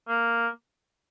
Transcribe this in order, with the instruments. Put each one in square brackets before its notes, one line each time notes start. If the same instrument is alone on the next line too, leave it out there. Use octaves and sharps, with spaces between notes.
[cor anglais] A#3